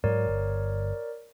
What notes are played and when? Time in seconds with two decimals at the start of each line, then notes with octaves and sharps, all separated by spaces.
0.04 G#2 F#3 A#4 C#5 D5
0.27 G1